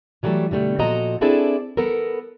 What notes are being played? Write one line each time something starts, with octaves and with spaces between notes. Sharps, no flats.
E3 F#3 G3 A3 A4
B2 D3 G3 A3
A#2 F3 F#4 A4 D#5 A#5
C4 D4 E4 G#4 A4 D5
B3 A4 A#4